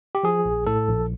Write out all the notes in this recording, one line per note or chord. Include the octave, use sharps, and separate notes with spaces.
G4
F3 G#4
A#1
A2 A4
A#1